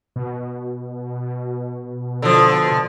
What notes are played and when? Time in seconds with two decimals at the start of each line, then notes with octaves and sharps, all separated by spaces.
0.16 B2
2.22 D3 F3